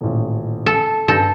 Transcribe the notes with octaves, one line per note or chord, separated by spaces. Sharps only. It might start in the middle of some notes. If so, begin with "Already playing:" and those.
D#1 A1
A4 C#7
G2 A4 G6 A#6